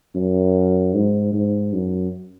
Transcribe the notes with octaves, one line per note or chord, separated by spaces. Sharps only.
F#2
G#2
G#2
F#2